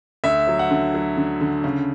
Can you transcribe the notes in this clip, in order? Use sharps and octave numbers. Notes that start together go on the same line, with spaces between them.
D2 E5
F#3
F#5
D3
F#3
D3
D3
C#3